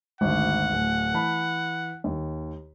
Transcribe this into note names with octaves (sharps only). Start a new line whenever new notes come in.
G#1 D2 F#5
D1
E3 A5 B5
D#2